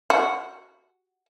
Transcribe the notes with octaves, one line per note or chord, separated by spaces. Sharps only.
F#4